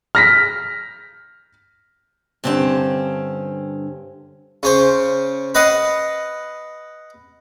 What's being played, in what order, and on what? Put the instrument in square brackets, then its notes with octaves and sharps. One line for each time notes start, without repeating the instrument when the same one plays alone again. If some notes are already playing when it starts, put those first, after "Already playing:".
[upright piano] F6 A#6 B6
[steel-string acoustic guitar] G2 D3 C4 C#4 A5
[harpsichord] C#3 C#4 C5
B4 D#5 F5 F#5